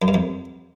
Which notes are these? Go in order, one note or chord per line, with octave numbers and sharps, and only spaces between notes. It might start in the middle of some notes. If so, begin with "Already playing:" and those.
F#2
G2
F2